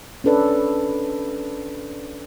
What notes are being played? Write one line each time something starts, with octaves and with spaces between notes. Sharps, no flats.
C#4 D4 A4 B4 D5